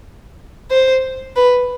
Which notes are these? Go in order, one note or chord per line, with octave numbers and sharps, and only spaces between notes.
C5
B4